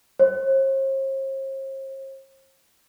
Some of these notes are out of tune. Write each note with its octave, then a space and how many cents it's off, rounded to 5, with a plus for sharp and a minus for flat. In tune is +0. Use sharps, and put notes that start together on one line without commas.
C5 +45